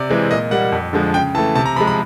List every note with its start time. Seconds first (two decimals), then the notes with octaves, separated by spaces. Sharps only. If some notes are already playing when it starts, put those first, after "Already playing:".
Already playing: C3 D5
0.10 E3 G#3 C4
0.31 A#2 D#5
0.51 G3 A#3 F#5
0.72 F2
0.93 D3 F3 G#3
1.14 C#3 G5
1.35 E3 A5
1.38 A3
1.55 C3 A5
1.66 A#5
1.76 F3 G#3 B5
1.87 B5